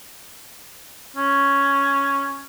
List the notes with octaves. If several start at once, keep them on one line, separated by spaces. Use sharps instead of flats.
C#4